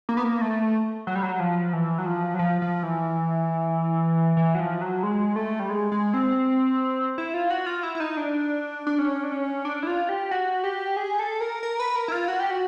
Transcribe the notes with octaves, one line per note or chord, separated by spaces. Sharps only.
A#3
B3
A#3
A3
F#3
G3
F#3
F3
E3
F#3
F3
F#3
F3
F3
E3
E3
F#3
F3
F#3
G#3
A3
G3
G#3
G#3
C4
E4
F4
F#4
F4
E4
E4
D#4
D4
D4
C#4
D4
C#4
D4
E4
F4
G4
F#4
G4
G#4
A4
A#4
A#4
B4
A#4
E4
F4
F#4
G4
F#4